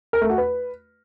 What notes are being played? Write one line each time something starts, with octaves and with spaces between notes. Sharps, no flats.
A#4
A3
F#4
B4